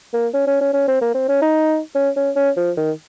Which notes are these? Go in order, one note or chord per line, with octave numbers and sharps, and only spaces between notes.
A#3
C#4
C#4
C#4
C#4
C4
A#3
C4
C#4
D#4
C#4
C#4
C#4
F3
D#3